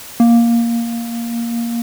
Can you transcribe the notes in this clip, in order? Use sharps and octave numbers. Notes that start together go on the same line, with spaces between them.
A#3